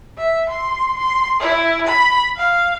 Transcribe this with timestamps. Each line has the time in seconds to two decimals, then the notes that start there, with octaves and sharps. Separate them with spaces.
0.18 E5
0.50 C6
0.98 C6
1.40 E4
1.87 B5
2.37 F5